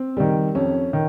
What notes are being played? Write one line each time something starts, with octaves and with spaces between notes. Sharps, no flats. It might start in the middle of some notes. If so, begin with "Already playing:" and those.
Already playing: C4
D#3 G3
F2 C#4
D#3